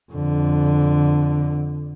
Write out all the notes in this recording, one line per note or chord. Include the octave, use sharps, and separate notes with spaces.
F2 D3